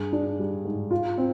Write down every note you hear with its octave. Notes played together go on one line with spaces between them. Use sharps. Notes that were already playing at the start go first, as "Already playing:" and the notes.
Already playing: G2 G#4
D4
G3
G#2
F4
C4